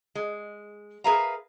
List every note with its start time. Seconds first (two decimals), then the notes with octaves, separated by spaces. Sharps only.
0.15 G#3
1.04 G#4 A#4 B4 E5 F5 A#5